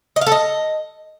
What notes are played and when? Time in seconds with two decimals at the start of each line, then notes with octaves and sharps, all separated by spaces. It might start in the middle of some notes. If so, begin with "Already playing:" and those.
0.16 D#5
0.21 F5
0.26 A4
0.32 D#5